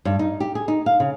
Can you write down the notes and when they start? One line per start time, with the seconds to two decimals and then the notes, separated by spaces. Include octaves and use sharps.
0.05 G2
0.19 D#4
0.40 G4
0.55 G#4
0.68 D#4
0.86 F5
1.00 C#3